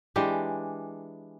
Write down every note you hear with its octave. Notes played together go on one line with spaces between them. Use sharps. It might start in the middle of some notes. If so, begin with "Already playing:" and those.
E3 G#3 D4 G4